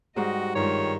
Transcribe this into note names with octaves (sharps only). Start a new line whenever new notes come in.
G#2 G3 F#4 D#5
G2 D#3 G#3 F4 C#5